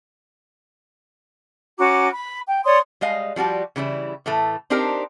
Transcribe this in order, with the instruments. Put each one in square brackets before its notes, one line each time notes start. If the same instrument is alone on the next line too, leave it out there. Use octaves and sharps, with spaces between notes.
[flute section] C#4 F#4 A#5 D6
B5
G5
C#5 D5 C6 D#6
[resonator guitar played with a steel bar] G3 G#3 D#5 F5
F3 G3 F#4 G4
C#3 E3 G3 E4
A2 E3 A3
C4 D4 D#4 G4 A#4 C5